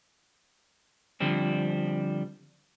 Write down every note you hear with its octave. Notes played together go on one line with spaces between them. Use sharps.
D3 F3 G3 C4